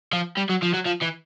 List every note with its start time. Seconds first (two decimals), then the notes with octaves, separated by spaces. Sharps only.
0.13 F3
0.37 G3
0.49 F#3
0.62 F3
0.73 F#3
0.86 F3
1.02 E3